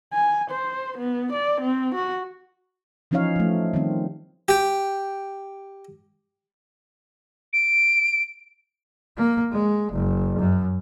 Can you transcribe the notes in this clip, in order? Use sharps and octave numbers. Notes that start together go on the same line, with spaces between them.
G#5
C5
B3
D5
C4
F#4
E3 F3 C#4 D#4 C#5 F5
F3 A3
D#3 G3 C4
G4 G5
D7
A#3
G#3
F#1
F#2